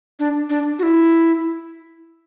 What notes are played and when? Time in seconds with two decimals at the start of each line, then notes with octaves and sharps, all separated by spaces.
0.20 D4
0.50 D4
0.79 F#4
0.83 E4